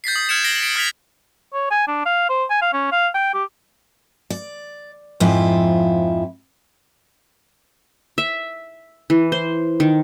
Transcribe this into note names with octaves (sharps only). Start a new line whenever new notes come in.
G6 A6 B6 C7
D#6
F6 G#6 C#7 D7 E7
A#6 C7 D7 E7 F#7 G7
B6 D7
D#6 F6 G#6 B6 F7
C#5
G#5
D4
F5
C5
G#5
F5
C#4
F5
G5
G4
D5
F2 G#2 F3 E4 F4
E5
E3
C5
D#3